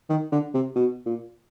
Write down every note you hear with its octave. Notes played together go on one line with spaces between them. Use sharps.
D#3
D3
C3
B2
A#2